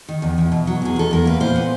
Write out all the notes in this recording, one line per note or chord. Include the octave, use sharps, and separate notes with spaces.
D#3
E2
E2
B2
F#3
E2 G#4
E2 A4
E2 A#4
A#3 B4
A#2 C5
B3